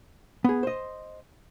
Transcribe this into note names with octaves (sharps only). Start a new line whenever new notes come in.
B3 G#4
C5 D#5